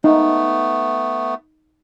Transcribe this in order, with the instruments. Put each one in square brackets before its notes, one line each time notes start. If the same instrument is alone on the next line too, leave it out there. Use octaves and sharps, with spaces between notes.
[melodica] A3 B3 [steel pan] D#4